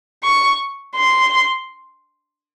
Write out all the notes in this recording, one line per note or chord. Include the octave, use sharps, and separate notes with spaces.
C#6
C6